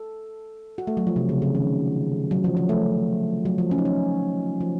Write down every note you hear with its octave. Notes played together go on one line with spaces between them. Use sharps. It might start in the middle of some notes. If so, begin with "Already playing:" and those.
Already playing: A4
F#4
A3
F#3
F3
C3
C#3
C#3
D#3
F#3
F3
F3
A3
F#3
F3
C#4
D#4
C#4
F3